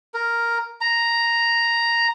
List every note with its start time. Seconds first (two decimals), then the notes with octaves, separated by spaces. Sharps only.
0.14 A#4
0.81 A#5